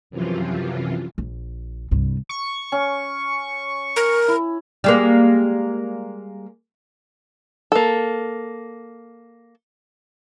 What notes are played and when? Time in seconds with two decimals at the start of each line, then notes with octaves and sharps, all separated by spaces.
0.10 F#2 C3 E3 F3 F4
1.18 A#1
1.91 C2 G2
2.29 C#6
2.72 C#4
3.96 A#4
4.28 E4
4.84 G3 G#3 A#3
7.72 A#3 A4